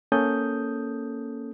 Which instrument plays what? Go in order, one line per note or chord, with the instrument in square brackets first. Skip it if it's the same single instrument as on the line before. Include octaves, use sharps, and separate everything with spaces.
[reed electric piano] A#3 C#4 A4 D#6 G6